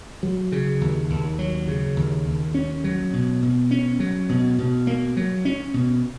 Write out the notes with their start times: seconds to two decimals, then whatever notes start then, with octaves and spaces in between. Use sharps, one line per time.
0.23 F#3
0.52 C#3
0.81 D#2
1.10 D#2
1.39 F#3
1.68 C#3
1.96 D#2
2.26 D#2
2.54 C#4
2.84 F#3
3.13 B2
3.42 B2
3.71 C#4
4.00 F#3
4.29 B2
4.59 B2
4.87 A#3
5.17 F#3
5.45 C#4
5.74 B2